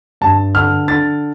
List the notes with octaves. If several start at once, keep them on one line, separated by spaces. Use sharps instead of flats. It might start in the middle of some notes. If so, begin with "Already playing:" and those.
G2 A5
D3 F6
D3 A6